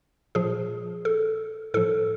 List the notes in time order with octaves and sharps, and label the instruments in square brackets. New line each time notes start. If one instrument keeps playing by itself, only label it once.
[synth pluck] A#2 F3 G#4
A4
A2 F3 A4